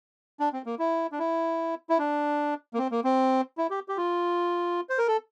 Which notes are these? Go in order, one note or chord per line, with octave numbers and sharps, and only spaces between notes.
D4
C4
A#3
E4
D4
E4
E4
D4
A#3
C4
A#3
C4
E4
G4
G4
F4
C5
A#4
A4